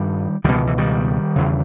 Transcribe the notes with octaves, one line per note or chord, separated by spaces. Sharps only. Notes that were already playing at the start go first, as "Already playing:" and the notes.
Already playing: G2 D#3 G3
C#2 B2 D#3 G3
D#3
E3
D#3 G3
E2 C#3